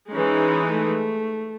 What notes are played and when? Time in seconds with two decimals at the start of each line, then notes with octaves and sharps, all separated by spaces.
0.12 E3 G#3 C#4 D#4
0.67 A3